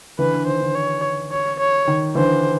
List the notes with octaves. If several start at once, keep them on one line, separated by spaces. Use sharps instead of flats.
D3 E3 B4
D3
D#3 C5
D3
C#5
C#5
C#5
D#3
D3 E3 C5